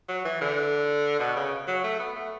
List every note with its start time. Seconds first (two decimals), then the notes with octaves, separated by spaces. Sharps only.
0.09 F#3
0.25 E3
0.41 D3
1.20 B2
1.36 C#3
1.68 F#3
1.84 A3
2.00 B3
2.16 A3